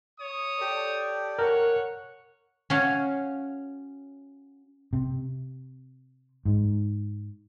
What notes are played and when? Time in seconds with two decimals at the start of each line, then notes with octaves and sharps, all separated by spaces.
0.18 C#5 D#6
0.59 G4 A4 D5
1.39 A#4 C#5 F#5
2.70 C#4 F#4 F5
4.93 C3
6.45 G#2